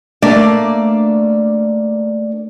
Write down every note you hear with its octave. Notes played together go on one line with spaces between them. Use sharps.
A3 A#3 D4 D5